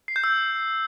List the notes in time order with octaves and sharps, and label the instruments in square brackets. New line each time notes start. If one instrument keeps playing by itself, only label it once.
[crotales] C7
G6
E6